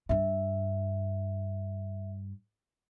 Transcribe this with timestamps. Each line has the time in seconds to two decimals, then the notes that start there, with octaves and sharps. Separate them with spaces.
0.09 G2 D4 E5